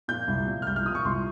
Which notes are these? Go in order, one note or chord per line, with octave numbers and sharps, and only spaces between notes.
A#2 F3 G6
C2
A#2 F3
F6
C2 G6
F6
A#2 F3 D#6
C#6
C2 C6